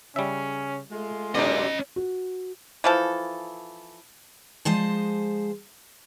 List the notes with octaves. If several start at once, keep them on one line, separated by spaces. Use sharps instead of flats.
C#3 G3 C#4 E5
G#3 A3 F4
F#2 C3 B3 C#4 D#4 D5 D#5
F#4
E3 F3 A4
F3 G#3 C5 A5